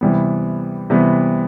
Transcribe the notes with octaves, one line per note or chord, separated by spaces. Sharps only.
C3 E3 G3 B3
C3 E3 G3 B3